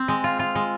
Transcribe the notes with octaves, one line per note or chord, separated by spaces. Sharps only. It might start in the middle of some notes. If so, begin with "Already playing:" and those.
Already playing: C4
G#3
F4
F4
G#3